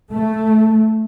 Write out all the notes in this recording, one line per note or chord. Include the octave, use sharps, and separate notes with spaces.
A3